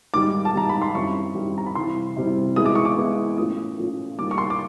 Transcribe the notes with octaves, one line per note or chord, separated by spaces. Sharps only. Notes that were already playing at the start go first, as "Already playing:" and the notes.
G#2 D#3 G3 D6
A5
G#2 D#3 G3 A#5
B5
C6
F#2 D#3 G3 C4 E4 C#6
F#2 D#3 G3 C4 E4
A#5
B5
C3 E3 G3 C4 C6
C3 E3 G3 C4
E3 G#3 B3 E4 D#6
D6
C#6
D6
E3 G#3 B3 E4
A2 F3 A3 C#4 F4 D#6
A2 F3 A3 C#4 F4
D#3 G3 A#3 D6
C#6
C6
D6